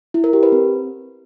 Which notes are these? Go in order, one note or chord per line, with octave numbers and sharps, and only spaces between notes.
E4
A#4
G4
B4
C4